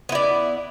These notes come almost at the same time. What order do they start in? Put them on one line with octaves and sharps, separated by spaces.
B3 E4 D5